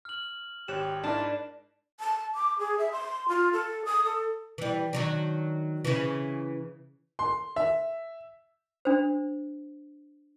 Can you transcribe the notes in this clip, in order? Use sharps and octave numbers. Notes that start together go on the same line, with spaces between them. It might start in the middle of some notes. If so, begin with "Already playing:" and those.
F6 F#7
G#1 G4 C#5 F#6 E7
G#2 D4 E4 A#4 A5
A5
D6
G#4
E5
C6
F4
A4
D#6
A4
E3 G3
D#3 F#3 D4
C#3 E3
C6
E5
D4 C5